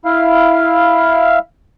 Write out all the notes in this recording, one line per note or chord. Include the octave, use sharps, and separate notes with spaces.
E4 F5